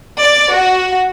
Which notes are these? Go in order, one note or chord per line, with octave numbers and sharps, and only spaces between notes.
D5
F#4